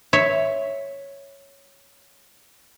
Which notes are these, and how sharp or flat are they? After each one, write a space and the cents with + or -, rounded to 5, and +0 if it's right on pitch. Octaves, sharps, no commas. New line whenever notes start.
C#5 +0 E5 +0